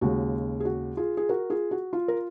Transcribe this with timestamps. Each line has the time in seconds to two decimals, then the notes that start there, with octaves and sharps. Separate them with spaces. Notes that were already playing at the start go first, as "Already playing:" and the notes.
0.01 D#2 C#3 G#3 F#4
0.60 G#4
0.65 F#4
0.97 F4 G#4
1.17 G#4
1.29 F#4 A#4
1.50 F4 G#4
1.71 F#4
1.93 F4
2.08 A#4